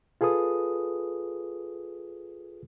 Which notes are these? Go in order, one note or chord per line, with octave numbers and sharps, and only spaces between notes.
F4 G#4 A4 B4 D#6